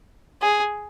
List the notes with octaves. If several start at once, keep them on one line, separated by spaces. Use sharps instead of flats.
G#4